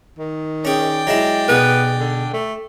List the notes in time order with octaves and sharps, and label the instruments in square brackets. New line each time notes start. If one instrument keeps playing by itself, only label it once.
[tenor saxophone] D#3
[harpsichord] C#4 G#4 [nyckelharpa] D5 G5
[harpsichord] F#3 G#3 E4
[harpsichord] B1 G#4 [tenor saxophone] B3
[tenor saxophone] D3
A3